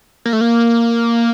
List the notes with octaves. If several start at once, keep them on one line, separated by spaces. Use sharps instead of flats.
A#3
A3
A#3